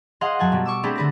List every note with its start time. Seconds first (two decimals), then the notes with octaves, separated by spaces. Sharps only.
0.21 G#4 D#5 F5 F#5 C6
0.39 F#2 F#3 G#5 A5 F#6
0.52 B2 G3
0.65 C#6 D6 E6
0.83 A3 C4 D4 G4 G#4 B4
0.96 D3 B4 A#6